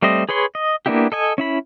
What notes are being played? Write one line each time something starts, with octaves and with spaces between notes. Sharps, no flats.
G3 A3 C4 C5 D#5
G#4 B4 C#5 C6
D#5
A#3 B3 D4 E4 G4
A4 D#5 G#5
C#4 E4 B5